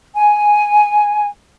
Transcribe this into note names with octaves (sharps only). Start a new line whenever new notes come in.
G#5